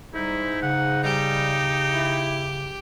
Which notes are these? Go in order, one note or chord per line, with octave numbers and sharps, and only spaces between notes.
G#2 G3 D#4 E4
C#3 F#5
G#2 G3 D#4 G4
E4